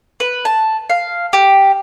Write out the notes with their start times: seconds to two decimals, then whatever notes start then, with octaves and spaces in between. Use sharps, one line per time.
0.20 B4
0.45 A5
0.90 F5
1.33 G4